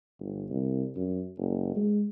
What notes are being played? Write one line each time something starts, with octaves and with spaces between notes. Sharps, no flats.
G1
C2
F#2
F#1
G#3